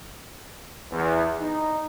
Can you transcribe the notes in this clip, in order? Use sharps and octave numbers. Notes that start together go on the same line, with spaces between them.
E2
D#4